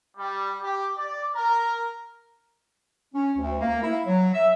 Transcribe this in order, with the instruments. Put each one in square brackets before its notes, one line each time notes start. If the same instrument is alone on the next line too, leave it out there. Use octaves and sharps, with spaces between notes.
[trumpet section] G3
G4
D5
A#4
[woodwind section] C#4
D2
A#3
E4
F#3
E5